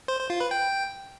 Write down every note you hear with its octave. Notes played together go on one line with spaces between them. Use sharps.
C5
C5
F4
B4
G5